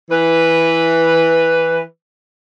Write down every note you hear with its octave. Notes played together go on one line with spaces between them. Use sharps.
E3 B4